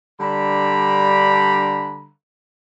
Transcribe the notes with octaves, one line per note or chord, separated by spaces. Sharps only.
D3 G3 D4 A#5 B5